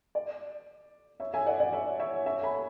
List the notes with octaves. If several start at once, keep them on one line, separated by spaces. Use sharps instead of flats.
D5
C#5 E5
E5 G#5
D5 F#5
D5 F#5
C#5 E5
C#5 E5
C#5 E5
G#5 B5